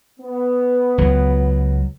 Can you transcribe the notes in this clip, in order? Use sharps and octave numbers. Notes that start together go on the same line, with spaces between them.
B3
C#2 F#3